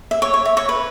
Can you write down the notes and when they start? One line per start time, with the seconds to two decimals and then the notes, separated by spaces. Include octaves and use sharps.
0.11 E5
0.22 C#5
0.34 C#5
0.45 E5
0.57 C#5
0.69 B4